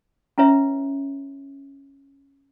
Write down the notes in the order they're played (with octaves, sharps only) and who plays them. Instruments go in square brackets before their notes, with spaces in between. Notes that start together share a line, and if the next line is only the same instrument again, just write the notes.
[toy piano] C#4 E4 B4 C#5 E5